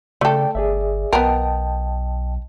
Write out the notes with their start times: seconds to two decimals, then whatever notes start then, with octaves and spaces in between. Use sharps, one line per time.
0.21 C#3 A3 A4 D5 G5
0.55 G1 G#4 D5 E5
1.13 B1 B3 A#4 D#5 G5 A5